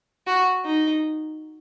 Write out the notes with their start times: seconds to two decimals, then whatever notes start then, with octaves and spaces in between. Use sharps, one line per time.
0.27 F#4
0.65 D#4